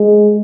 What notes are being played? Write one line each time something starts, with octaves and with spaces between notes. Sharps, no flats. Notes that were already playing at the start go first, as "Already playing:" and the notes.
Already playing: G#3